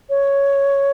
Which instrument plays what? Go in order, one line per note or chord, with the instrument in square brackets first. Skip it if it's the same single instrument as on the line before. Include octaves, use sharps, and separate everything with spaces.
[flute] C#5